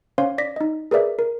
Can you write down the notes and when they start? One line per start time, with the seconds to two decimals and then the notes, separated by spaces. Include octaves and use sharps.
0.18 C#4 C5 C#5 F5 C6
0.38 D5 A#6 B6
0.56 D#4 D#5
0.91 G#4 A#4 B4 D5 E5
1.19 A#4